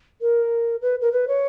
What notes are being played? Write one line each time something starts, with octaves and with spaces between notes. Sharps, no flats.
A#4
B4
A#4
B4
C#5